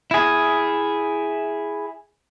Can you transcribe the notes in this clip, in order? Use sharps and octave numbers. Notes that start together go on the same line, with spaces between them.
E4 G#4